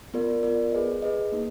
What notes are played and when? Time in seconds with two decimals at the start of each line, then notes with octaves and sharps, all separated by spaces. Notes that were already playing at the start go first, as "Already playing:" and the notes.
0.14 B3 F4 A#4 D5
0.43 B3 F4 A#4 D5
0.72 G#4 B4 D#5
1.02 G#4 B4 D#5
1.32 A#3 D#4